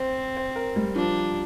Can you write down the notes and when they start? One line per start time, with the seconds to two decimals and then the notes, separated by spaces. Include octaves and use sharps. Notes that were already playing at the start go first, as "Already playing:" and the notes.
Already playing: C4 C5
0.37 C5
0.56 A#4
0.76 G3
0.95 F3 D4